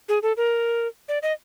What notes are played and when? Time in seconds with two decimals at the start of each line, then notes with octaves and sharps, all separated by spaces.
0.09 G#4
0.23 A4
0.37 A#4
1.09 D5
1.22 D#5